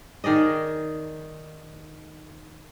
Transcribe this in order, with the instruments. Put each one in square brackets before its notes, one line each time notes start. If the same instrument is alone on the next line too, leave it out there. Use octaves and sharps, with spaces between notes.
[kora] D#3 G#4 D5 D#5